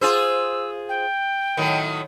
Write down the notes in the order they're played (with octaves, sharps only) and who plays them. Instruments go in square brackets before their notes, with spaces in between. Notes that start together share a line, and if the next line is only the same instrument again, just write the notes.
[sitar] F4 G#4 C5 [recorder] E6
[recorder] G5
[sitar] A2 D#3 F#3